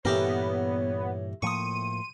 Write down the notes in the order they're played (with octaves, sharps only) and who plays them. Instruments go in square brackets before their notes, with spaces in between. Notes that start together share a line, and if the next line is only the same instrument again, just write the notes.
[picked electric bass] G2 A#2 E3 [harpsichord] A3 G4 A#4 [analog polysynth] B3 [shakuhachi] C#5
[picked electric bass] A2 F3 A#3 [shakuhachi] C6 [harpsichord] C#6 D#6 [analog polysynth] D#7